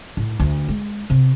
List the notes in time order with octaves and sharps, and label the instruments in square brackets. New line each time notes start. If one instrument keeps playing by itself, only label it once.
[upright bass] A2
D2
G#3
C3